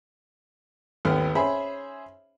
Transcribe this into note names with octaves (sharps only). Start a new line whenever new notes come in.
G#1 D#2 A3 B3 F6
C#4 G#4 C5 E5 B5